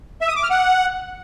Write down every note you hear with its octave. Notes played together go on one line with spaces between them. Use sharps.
E5
D#6
D6
F6
F#5